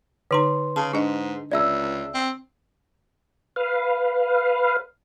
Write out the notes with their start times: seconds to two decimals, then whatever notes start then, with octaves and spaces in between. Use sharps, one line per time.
0.31 D3 D#4 B4 A#5 C6
0.76 C#3 A5
0.93 G#2 D4 D#5
1.52 C#2 D5 E5 E6
2.14 C4
3.56 B4 F5